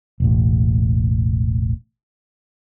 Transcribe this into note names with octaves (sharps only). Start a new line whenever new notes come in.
E1 A1